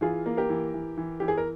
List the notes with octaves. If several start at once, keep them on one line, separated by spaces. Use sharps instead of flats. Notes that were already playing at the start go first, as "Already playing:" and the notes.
E3 F4 G#4
A#3
G4 A#4
E3
E3
E3
E3 G4
G#4
A#4